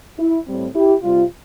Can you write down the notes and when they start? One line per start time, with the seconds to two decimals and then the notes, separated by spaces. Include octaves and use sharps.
0.19 E4
0.47 A2 G3 C4
0.75 E4 G4
1.03 C3 G3 C4 F4